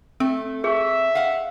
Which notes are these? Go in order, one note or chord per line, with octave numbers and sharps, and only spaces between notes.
A3 C4
G#4 E5 C#6
F5 F#5